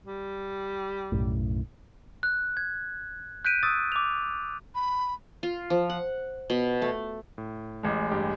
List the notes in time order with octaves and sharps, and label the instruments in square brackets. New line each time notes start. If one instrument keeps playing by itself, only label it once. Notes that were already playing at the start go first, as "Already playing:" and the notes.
[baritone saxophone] G3
[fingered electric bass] B1 F#2 A2
[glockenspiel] F#6
G#6
F#6 G6 B6 D7 D#7
C#6 D#6 E6 A6 D#7
D6 F7
[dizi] B5
[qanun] F4
F3
F#5
B2
A3
[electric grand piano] A2
[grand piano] A1 G#3
[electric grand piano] G2 G4